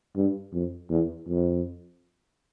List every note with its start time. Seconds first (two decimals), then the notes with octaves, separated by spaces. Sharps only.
0.16 G2
0.53 F2
0.90 E2
1.28 F2